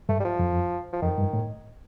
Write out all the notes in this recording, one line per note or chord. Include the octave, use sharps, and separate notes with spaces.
G2 A3
G3
F3
F2
F3
F2 D#3
G2
A2